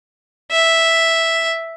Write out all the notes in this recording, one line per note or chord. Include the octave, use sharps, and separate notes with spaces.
E5